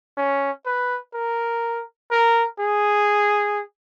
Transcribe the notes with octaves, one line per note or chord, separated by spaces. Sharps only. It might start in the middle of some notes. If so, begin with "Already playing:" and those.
C#4
B4
A#4
A#4
G#4